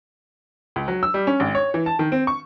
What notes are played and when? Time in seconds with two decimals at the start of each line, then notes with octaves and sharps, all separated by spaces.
0.76 C#2
0.88 F#3
1.03 E6
1.14 G3
1.27 C#4
1.40 G#1
1.55 C#5
1.74 E3
1.86 A5
1.99 D#3
2.12 C4
2.27 C#6